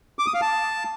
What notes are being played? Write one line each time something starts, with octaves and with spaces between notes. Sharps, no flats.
D6
D#6
F5
A5